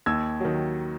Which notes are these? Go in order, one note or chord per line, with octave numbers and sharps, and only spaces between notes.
D#2 E6 G#6
D#3 F#3